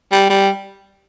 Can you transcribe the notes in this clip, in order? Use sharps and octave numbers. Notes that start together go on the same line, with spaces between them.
G3
G3